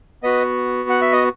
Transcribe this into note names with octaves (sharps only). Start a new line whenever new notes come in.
B3 F#4 B4 D#5
F#5
E5
D#5